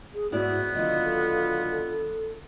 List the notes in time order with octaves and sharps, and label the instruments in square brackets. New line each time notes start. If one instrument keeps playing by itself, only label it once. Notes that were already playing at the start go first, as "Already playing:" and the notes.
[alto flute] G#4
[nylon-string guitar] G#2 E4 D5 [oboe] B3 [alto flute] F#4
[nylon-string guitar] D3 D#3 F#3 [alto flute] F4 [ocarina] D#5
[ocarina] A4